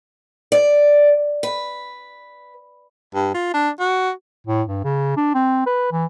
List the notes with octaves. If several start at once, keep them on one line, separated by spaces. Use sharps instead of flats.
D5
B4
G2
F4
D4
F#4
A2
G2
C#3
D4
C4
B4
E3